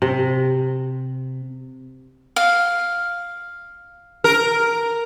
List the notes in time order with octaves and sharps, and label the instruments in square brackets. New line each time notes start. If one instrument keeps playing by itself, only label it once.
[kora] C3
[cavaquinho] F5
[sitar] A#4